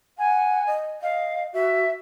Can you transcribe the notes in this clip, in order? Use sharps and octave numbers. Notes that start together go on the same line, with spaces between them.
F#5 G#5
D#5
D#5 F5
F#4 E5